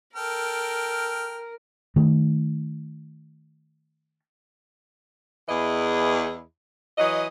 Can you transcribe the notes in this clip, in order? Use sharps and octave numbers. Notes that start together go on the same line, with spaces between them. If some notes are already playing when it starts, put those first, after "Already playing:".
A4 A#4 G5 F6
D#3 A3
E2 E3 E4 G#4 D#5
E3 F#3 D#5